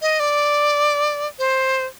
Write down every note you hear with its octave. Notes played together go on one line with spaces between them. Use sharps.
D#5
D5
C5